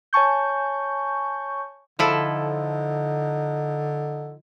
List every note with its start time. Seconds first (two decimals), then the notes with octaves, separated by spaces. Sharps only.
0.13 C#5 G#5 A5 C#6 G6
1.99 D3 F3 D#4 E4 A4